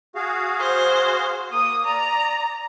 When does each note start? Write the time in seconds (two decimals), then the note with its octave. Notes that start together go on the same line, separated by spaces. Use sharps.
0.15 F#4 G#4 F5
0.60 C5
1.52 A#3 D#6
1.85 D5 A#5